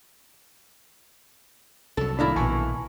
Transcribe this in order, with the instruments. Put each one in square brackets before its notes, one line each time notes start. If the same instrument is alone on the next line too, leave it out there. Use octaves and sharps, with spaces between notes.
[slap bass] C2 F#3 [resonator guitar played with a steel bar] A4
[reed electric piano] A2 D4 [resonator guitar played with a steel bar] D#3 A#3 E4
[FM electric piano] A#1 B2 [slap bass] E3 [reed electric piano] G#5 A5 C#6